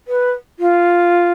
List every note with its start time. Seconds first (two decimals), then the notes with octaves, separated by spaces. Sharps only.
0.08 B4
0.59 F4